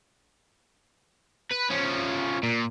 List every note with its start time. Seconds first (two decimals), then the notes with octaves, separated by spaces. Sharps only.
1.52 B4
1.70 F3 C#4
2.43 A#2